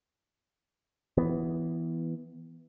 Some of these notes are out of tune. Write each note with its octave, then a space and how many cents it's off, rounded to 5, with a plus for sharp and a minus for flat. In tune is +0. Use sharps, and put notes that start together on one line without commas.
E3 +0 B3 +0